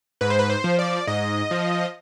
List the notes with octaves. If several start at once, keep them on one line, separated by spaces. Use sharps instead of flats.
G#2 B4
C5
B4
C5
F3
D5
G#2 D#5
F3